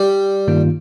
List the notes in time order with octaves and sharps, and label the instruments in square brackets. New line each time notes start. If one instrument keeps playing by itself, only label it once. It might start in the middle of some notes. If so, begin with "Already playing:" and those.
Already playing: [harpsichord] G3
[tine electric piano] G2 D#3 A#3 F4